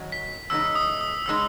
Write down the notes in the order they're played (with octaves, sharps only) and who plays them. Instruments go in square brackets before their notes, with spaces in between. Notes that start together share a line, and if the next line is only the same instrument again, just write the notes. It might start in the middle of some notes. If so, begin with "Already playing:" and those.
Already playing: [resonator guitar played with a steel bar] D#3 F#3 C#4
[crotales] B6
[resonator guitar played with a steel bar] E2 C#3 G#3 D#4 [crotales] E6
[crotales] D#6
D#6
[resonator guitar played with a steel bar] C#3 G#3 D#4 [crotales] E6